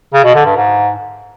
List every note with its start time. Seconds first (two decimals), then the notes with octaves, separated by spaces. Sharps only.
0.13 C#3
0.24 B2
0.35 D3
0.46 G2
0.56 G#2